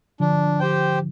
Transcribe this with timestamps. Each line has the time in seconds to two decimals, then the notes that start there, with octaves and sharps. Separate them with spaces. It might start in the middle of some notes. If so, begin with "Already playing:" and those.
0.20 D3 F3 D4
0.60 G4 C5 G5